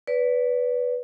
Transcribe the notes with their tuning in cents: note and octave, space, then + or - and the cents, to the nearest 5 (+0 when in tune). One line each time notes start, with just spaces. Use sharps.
B4 +0 D5 -30